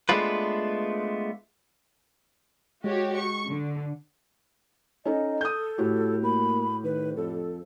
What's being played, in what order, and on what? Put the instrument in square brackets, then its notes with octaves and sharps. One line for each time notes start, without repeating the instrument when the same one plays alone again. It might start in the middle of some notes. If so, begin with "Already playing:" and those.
[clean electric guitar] G#3 A3 B3 D4 F4 B4
[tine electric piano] G#3 [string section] F#4 G4 C#5
[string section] C#6
D3
[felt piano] C#4 D#4 A4 [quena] D#5
[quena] A4 [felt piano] D#6 G6
[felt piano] A2 F#4 G4
[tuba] A#3 [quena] B5
[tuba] D#3 [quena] B4
[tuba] F2 [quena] A4